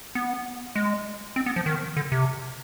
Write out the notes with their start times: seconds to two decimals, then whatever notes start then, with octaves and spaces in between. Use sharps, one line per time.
0.15 B3
0.76 G#3
1.36 C4
1.46 B3
1.56 F3
1.66 D#3
1.97 D3
2.12 C3